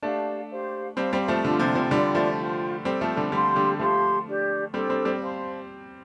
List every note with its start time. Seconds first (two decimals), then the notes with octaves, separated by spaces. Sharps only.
0.03 A3 D4 G4 D5 F5 A5
0.50 G4 C5 F5
0.97 G3 C4 C5 F5 A5
1.13 G3 C4
1.28 F3 A3
1.44 D3 D4 F4 C5
1.59 C3 F3
1.75 C3 F3
1.91 D3 G3 D4 F4 D5 G5
2.15 F3 A3
2.38 F4 C5 G5
2.85 G3 C4 A4 C5 G5
3.01 F3 A3
3.17 D3 G3
3.32 D3 G3 G4 F5 A5 C6
3.56 D3 G3
3.79 F3 A3 G4 F5 C6
4.27 D4 G4 D5
4.74 G3 C4 D4 A4 C5 G5
4.90 G3 C4
5.05 G3 C4
5.21 C5 F5 A5 C6